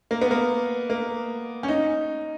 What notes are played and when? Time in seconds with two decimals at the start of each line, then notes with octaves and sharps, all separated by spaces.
0.11 A#3
0.22 B3
0.31 A#3
0.90 A#3
1.63 C#4
1.68 D#4